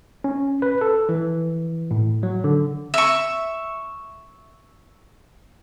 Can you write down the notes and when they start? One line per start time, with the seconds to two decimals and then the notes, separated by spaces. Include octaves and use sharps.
0.24 C#4
0.62 B4
0.81 A4
1.09 E3
1.91 A2
2.23 F#3
2.44 D3
2.94 E5 C#6